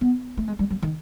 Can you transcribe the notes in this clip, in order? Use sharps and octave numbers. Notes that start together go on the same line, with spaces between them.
B3
A3
G#3
G3
F#3
D#3